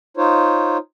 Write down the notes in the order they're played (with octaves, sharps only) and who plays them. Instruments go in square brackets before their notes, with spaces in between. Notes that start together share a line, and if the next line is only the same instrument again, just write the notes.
[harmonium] D#4 F4 C5 C#5